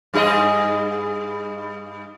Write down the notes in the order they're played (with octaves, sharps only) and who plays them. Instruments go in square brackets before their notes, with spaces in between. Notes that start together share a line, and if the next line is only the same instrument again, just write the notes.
[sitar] G2 G#4 D#5